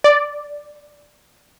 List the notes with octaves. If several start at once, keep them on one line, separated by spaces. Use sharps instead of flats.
D5